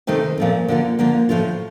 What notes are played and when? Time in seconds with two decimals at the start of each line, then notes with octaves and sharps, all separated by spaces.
0.07 C3 D#3 A3 C4 D#4
0.38 A#2 F3 A3 C4
0.68 D3 F3 A#3 F4
0.99 D3 F3 A#3 F4
1.29 A2 F3 A3 D4 F4